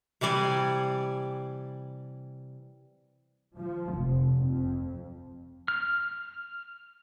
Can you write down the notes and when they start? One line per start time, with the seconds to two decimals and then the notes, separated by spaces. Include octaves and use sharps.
0.21 C3 E3 G3 D5 G#5
3.57 F3
3.95 F1
4.45 F2
5.68 F6